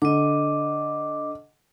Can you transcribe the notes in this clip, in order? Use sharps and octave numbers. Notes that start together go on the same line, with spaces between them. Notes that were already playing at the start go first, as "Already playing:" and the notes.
D3 D#5 D6